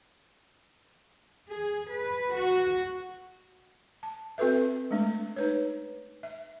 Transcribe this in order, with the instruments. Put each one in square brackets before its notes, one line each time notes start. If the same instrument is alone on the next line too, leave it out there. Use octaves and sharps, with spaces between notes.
[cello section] G#4
B4
F#4
[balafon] A5
C4 F#4 A4 B4 E5
G#3 A3 D4
D#4 B4 C#5
E5